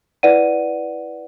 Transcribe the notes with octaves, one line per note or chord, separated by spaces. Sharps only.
E4 B4 D5 F#5 D#7